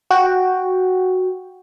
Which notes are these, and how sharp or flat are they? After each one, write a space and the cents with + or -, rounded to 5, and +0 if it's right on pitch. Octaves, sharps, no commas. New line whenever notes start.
F#4 +0 G5 +0